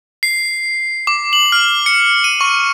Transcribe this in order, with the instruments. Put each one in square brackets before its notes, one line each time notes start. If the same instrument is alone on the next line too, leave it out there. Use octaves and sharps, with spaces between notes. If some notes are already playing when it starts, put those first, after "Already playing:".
[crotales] C7
D6
F#7
F6
C#7
D#7
C#6